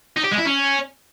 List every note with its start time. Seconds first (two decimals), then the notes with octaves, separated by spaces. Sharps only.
0.17 D#4
0.24 G4
0.31 G#3
0.38 E4
0.45 C#4